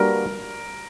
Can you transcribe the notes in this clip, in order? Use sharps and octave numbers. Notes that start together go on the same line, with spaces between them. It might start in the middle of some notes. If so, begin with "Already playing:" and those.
Already playing: G3 A#3 D4 F#4 A#4 B4